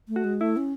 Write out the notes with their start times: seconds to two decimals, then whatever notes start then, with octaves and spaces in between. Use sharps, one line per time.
0.08 A3
0.16 F#4
0.24 G#3
0.41 A3 E4
0.57 C#4